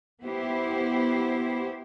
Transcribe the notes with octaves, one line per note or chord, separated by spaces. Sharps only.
B3 E4 G4 C5